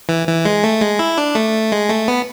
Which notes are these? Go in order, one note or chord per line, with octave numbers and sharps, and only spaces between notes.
E3
E3
G#3
A3
G#3
E4
D4
A3
G#3
A3
B3